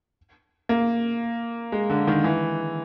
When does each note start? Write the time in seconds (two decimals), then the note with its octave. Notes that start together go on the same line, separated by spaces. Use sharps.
0.69 A#3
1.72 G#3
1.90 D3
2.07 D#3
2.24 E3